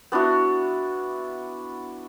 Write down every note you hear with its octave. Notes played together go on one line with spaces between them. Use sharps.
B3 D4 E4 F#4